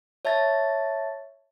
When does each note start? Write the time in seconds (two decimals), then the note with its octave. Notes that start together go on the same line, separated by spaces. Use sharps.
0.25 C#5 E5 A5 G#6 A6